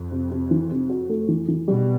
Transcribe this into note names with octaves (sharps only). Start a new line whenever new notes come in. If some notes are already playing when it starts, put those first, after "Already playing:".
Already playing: F2
C3
C3
E3
C3
F#4
A3
E3
E3
B2 G3